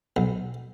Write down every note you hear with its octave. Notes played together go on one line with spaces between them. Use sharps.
B1